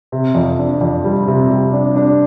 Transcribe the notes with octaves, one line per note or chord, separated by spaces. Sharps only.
C3
F2
D4
F2
G3
C3
G3
D4
D4